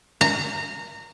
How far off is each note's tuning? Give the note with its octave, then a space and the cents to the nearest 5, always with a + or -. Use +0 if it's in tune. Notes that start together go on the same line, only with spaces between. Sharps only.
A#5 -25